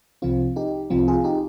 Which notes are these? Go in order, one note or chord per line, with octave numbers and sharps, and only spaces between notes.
C2 C3 F3 C4 F4
D#4 G4
C2 C3 F3 C4 F4
F4 G#4
D#4 G4